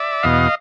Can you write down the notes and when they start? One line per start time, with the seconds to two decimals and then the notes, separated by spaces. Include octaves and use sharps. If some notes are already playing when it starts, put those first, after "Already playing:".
Already playing: D5 E5
0.23 E2 B2 D#5 F5